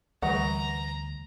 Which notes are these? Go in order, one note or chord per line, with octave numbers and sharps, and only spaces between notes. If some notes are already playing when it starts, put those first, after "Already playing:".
D2 E3 G3 A3 B4 F#5 A#5